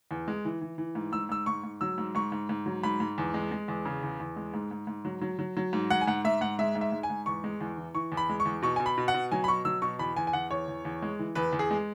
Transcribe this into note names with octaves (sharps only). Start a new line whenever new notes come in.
E2
G#3
E3
E3
E3
G#2
G#2 E6
G#2 E6
G#2 C#6
G#2
F#3 E6
G#2
G#2 C#6
G#2
G#2
F#3
G#2 B5
G#2
E2
G#3
G#3
E2
C#3
E2
E2
G#3
G#2
G#2
G#2
F#3
F#3
F#3
F#3
G#2
G#2 F#5
G#5
G#2 F#5
G#2 E5
G#2 F#5
G#3 E5
G#2
E5
G#2
G#5
G#2
E2 C#6
G#3
E2
E3
E3 C#6
E2
B5
G#3
C#6
E2
B2 C#6
B2 G#5
B5
B2
F#5
B2
F#3 G#5
B5
B2 C#6
F#3 E6
B2 C#6
E2 B5
E2 G#5
G#5
E2 F#5
E2 C#5
E2
E2
G#3
E3
E2 B4
E2
G#4
G#3